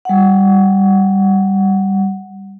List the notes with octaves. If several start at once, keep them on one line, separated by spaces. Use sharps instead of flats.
G3 F#5